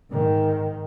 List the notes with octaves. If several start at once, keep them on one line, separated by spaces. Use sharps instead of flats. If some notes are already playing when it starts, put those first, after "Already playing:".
G#2 D#3